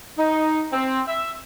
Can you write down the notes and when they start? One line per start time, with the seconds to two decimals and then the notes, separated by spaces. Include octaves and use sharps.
0.18 D#4
0.73 C4
1.08 E5